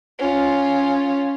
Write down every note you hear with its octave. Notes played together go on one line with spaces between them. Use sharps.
C#4 F4